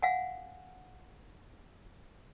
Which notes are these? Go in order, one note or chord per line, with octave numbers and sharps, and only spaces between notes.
F5 F#5 G#5